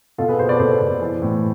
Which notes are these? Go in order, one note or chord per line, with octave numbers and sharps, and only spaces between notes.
B2 F4 A4
G#4 B4
B2 A4 C5
B4 D5
B2 A4 C5
B2
E3
A2